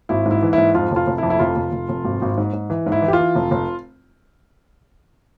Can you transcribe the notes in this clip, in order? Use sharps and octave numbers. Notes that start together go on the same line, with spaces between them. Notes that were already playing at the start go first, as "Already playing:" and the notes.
G#1 E4
G#2
E4
E3
G#2 E4
F2 F4
F1 F4
F1
E4
F2
E4
F1 F4
F1
F1
F1
G#1
G#1
G#2
G#2
E3
G#2
E4
E3
G4
F4
E3
F1
F1